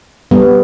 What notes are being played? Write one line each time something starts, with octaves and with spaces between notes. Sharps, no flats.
G3 B3